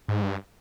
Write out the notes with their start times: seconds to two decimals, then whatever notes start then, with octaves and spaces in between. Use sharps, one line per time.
0.08 G#2
0.23 G2